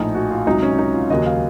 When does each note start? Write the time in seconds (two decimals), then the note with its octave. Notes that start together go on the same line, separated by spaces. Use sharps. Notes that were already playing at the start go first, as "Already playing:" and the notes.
Already playing: A#1 A2 F3 D#4
0.14 F#4
0.31 F4
0.46 C#2 C3 F#3 D#4
0.63 C#4
0.78 D#4
0.94 F4
1.10 D#2 C#3 F#3 D#5
1.26 F5